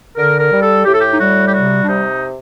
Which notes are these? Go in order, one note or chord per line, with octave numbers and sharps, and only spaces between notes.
D3 A#4
A#4
G3
A4
A2 G4
A4
G4
D#4
G3 F#4
G4
C3 F#4
D4
C3 D#4